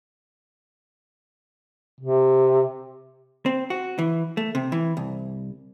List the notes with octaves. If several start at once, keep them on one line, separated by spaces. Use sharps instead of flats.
C3
C4
F#4
E3
A3
C3
E3
C2